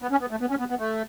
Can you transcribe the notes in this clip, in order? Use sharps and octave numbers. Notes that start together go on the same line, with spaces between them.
B3
C#4
B3
A3
B3
C#4
B3
B3
A3